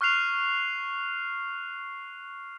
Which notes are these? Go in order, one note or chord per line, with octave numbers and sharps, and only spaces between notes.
C#6 F6 F#6 C7 F7